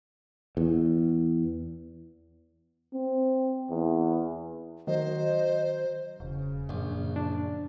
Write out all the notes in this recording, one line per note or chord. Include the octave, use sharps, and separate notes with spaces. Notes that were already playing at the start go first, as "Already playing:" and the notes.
E2
C4
E2
D#3 F#3 C5 D#5
E1 C#3
A#1 F#2
D4